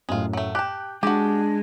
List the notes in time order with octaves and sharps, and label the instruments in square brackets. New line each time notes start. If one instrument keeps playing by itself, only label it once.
[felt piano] F#2 A2 [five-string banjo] G#3 F4
[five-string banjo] F#3 A3
[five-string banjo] G4 A5 [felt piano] G5 F#6
[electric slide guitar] G#3 [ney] D4 [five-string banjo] F#4 G4